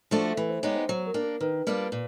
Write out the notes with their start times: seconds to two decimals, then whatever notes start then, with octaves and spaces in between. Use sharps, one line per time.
0.11 F3 A3 D4 F#4
0.37 E3 B4
0.50 C5
0.63 G#3 B3 D#4 G4 C#5
0.75 C5
0.88 F#3 C5
1.07 A#4
1.14 A#3 D4
1.23 A#4
1.41 D#3 B4
1.67 G3 A#3 D4 F4
1.92 A#2